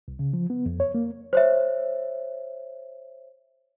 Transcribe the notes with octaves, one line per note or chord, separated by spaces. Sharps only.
C2
C#3
F3
B3
F2
C#5
A#3
C5 C#5 E5